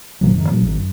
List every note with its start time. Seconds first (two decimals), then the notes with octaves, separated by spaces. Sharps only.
0.21 G#1 A#2 D#3 F#3
0.34 F#2 A2 D3 D#3
0.49 A#2 F#3 D4
0.62 G#1 B2 D#3
0.75 F#2